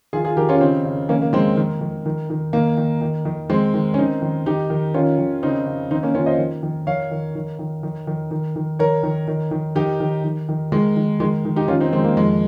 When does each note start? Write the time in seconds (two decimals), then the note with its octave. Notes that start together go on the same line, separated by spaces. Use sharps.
0.13 D#3 F4 G#4
0.25 F4 G#4
0.37 D#3 G4 A#4
0.49 C#4 F4
0.61 C#3 C4 D#4
0.85 C#3
1.09 D#3 A#3 C#4
1.22 A#3
1.33 D#3 G#3 C4
1.57 D#3
1.81 D#3
2.06 D#3
2.30 D#3
2.53 D#3 A#3
2.77 D#3
3.01 D#3
3.25 D#3
3.50 D#3 G#3 C4
3.74 D#3
3.94 C#4
3.98 D#3 C4 D#4
4.22 D#3
4.46 D#3 D#4 G4
4.70 D#3
4.94 D#3 C#4 F4
5.18 D#3
5.43 C#3 C4 D#4
5.66 C#3
5.91 D#3 C4 D#4
6.03 A#3 C#4
6.15 D#3 C#4 F4
6.26 C5 D#5
6.38 D#3
6.63 D#3
6.87 D#3 C#5 F5
7.11 D#3
7.35 D#3
7.59 D#3
7.83 D#3
8.07 D#3
8.31 D#3
8.56 D#3
8.79 D#3 A#4 C#5
9.03 D#3
9.28 D#3
9.51 D#3
9.75 D#3 D#4 G4
10.00 D#3
10.24 D#3
10.49 D#3
10.72 D#3 G#3
10.97 D#3
11.20 D#3 G#3
11.45 D#3
11.56 D#4 G4
11.68 D#3 C#4 F4
11.80 C4 D#4
11.92 D#3 G#3 C4
12.04 A#3
12.16 F2 G#3